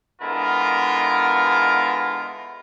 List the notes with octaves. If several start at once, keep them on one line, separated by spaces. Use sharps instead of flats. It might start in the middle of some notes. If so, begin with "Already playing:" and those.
D3 G#3 B3 E4 F4 A#4